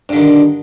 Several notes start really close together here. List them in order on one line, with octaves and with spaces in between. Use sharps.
G2 D3 D#3